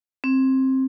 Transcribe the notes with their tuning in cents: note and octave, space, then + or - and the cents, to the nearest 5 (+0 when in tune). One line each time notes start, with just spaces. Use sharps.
C4 +15